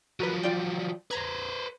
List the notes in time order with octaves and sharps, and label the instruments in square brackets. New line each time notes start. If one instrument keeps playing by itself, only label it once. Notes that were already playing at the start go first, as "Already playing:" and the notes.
[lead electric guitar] F3 F#3 [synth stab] F#4 A#4 B4
[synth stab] F4 D5 G5
[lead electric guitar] B4 C5 [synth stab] A#5 G#6